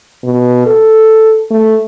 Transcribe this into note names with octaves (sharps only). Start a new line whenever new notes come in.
B2
A4
A3